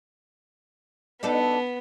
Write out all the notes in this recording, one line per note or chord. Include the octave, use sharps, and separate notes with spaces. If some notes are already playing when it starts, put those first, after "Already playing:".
B3 D4 D#4 A4